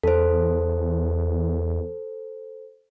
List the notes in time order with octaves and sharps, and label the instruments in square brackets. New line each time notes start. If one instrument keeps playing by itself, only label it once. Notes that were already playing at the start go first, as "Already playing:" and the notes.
[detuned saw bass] E2 [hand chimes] A4 C5